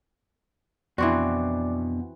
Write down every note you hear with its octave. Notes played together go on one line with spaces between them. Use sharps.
F2 B2 E3 C4 D4 F#4 D5 D6